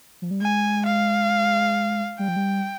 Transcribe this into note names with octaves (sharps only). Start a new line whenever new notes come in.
F3
G3
G#3 G#5
F5
G3 G5
F3
G3